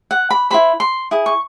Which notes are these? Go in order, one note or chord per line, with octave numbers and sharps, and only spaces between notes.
F#5
B5
E4 G#4 C5 B5
C6
E4 G#4
C#6